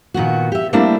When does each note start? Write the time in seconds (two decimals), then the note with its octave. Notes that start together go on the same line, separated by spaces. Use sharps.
0.14 A#2 D#3 B3 F#4
0.52 G4 E5
0.73 G3 A3 A#3 C4 D4 E4